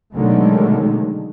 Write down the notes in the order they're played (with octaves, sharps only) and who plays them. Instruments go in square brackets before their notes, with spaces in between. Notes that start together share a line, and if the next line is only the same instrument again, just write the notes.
[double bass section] B2 D3 D#3 F#3 G#3 A3